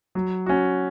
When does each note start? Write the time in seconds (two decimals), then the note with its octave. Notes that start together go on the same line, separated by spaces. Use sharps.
0.15 F#3
0.46 C#4 F#4